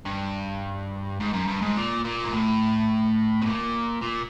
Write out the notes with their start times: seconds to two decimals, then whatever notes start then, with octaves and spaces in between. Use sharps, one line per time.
0.06 G2
1.20 G#2
1.33 F#2
1.48 G2
1.61 G#2
1.76 A#2
2.04 A#2
2.24 G#2
2.33 A2
3.42 B2
3.46 A#2
4.02 A#2